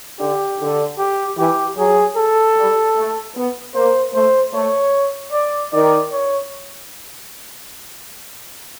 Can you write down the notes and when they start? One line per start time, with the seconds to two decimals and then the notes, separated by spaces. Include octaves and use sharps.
0.19 D3 G4
0.59 D3
0.98 G4
1.37 E3 G4
1.77 F#3 G#4
2.17 A4
2.56 G3
2.96 A3
3.36 B3
3.75 A#3 C5
4.14 A3 C5
4.53 A3 C#5
5.32 D5
5.73 D#3 D5
6.12 C#5